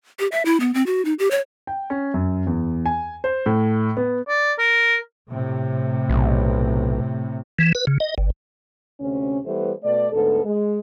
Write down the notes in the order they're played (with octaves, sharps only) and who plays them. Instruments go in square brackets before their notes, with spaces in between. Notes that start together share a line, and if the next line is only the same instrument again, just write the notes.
[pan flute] G4
E5
E4
B3
C4
F#4
D#4
G4
C#5
[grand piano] G5
C#4
F#2
E2
G#5
C5
A2
B3
[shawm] D5
A#4
[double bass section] A2 C3
[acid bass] B1
[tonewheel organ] E3
B4
C#3
D#5
G1
[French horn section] D2 C3 C#4
E3 G3 A3 B3 C5
B2 A3 D5
D2 G#2 B3 A4
G#3